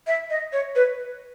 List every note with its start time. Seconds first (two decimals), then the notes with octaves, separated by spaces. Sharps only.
0.07 E5
0.30 D#5
0.53 C#5
0.76 B4